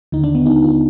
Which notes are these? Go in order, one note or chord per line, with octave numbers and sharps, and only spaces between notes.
D#2 D3 D#4
D4
B3
D#4
F4